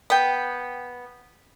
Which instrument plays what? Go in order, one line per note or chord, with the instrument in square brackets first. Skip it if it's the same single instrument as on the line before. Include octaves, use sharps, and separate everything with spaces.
[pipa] B3 G5